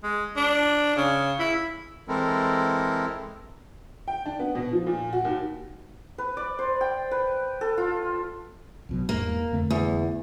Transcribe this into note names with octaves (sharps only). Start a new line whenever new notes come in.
G#3
D4
C#3
E4
E3 G#3 C4 E4 A4 A#4
G5
D4
B3
B2
F3
A#2
F#4
D#2
B4
D5
C5
G5
B4
A4
F4
B1 B2 F#3
E2 G#2 A#3
F2 D3 A3
E2